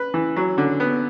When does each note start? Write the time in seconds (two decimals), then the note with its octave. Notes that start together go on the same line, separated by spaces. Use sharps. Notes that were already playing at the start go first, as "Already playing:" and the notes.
Already playing: B4
0.14 E3
0.36 F#3
0.58 D3
0.80 B3